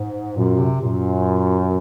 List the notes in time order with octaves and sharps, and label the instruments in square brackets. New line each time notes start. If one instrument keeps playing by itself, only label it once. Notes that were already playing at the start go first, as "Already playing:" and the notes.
Already playing: [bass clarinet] G#2
[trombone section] F#2 [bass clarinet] A#2
[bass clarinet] C3
[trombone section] F#2 [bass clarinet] A#2